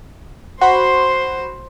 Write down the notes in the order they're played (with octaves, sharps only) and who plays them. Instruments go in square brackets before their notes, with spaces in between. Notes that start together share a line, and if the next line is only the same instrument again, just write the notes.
[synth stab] F#4 B5 [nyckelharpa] C5 [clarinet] C6